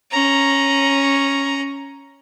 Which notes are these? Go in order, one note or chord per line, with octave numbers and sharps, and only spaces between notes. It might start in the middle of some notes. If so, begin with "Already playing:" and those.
C#4 A#5